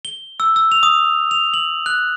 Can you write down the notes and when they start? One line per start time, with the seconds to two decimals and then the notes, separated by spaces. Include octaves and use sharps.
0.05 G7
0.40 E6
0.56 E6
0.72 F7
0.83 D#6
1.31 F7
1.54 F#7
1.86 F#6